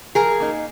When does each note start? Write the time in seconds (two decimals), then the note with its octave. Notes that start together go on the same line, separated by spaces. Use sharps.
0.15 F3 G#4 A#4
0.40 A#3 D#4